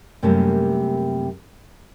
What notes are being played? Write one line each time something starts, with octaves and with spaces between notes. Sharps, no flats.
F#2 C3 G3 A3 A#3 C#4